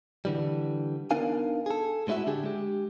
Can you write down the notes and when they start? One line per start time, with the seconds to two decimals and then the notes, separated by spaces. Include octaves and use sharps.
0.25 D3 E3 G3
1.11 B3 D4 D#4 A#4 F5 G#5
1.66 G#4 A4
2.07 A2 G#3 C#4 E4 F#4 E5
2.27 D3 D4 G4 G#4
2.43 G#3 G4